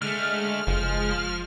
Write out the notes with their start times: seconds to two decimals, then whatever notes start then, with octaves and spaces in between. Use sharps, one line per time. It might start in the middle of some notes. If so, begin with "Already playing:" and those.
0.02 D3 G#3 A3 F6
0.67 F#1 F3